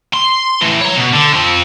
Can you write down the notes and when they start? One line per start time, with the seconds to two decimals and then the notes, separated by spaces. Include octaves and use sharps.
0.13 C6
0.61 A2 E3
0.81 C#5 A#5
0.95 B2
1.13 D3
1.33 F3 C4